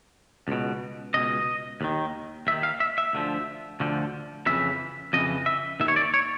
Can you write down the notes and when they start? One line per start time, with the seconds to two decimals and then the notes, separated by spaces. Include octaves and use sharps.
0.48 C#2 B2
1.14 C#2 B2 D#5
1.81 D#2 D#3
2.47 D#2 E5
2.51 D#3
2.63 F5
2.80 E5
2.98 E5
3.13 D2 D3 F3
3.80 D2 D3 F3
4.46 F2 C#3 E3 E5
5.13 F2 C#3 E3 D#5
5.46 E5
5.80 D#2 D#3 E5
5.88 C#5
5.96 D5
6.14 C#5